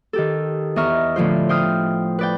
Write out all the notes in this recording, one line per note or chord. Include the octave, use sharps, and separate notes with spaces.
D#3 G4 A4
E2 D#5 E5 A#5 C#6 F6
A2 D3 F3 F4 C5
C5 G5 D#6 F6
B4 D5 G5